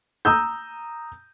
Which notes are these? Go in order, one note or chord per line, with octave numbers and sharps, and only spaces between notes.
A#5 D#6 E6 G6